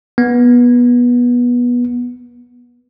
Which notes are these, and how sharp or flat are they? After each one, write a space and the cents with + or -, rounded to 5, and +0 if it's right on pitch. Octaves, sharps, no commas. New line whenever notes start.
B3 -20